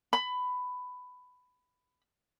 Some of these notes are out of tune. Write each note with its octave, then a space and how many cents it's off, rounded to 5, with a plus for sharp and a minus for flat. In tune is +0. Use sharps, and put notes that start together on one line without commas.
B5 +15